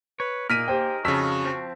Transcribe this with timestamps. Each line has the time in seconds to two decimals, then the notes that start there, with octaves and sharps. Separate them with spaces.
0.20 B4 C#5
0.50 A#2 A#3 D#4 G#4 A#4 F6 B6 D#7
0.68 G4 C5 G5
1.05 F2 C#3 F#4 A5 E6 B6
1.45 F3 C4